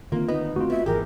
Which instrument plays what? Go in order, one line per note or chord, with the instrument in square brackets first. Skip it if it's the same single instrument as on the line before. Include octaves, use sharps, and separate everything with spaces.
[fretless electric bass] D3 D#3 C4 [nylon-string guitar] A#3 [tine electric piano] F4
[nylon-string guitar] B3 [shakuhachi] D#4 [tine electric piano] D#5
[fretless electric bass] A3 C4 [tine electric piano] F4 F#4
[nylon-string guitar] B3 [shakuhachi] E5
[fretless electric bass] G#1 D#3 E3 [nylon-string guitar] G4 [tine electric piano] G#4 [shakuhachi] A#4